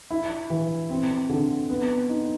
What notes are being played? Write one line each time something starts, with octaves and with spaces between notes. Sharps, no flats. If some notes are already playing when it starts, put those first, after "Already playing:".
E4
E3
C4
D3
B3
D#4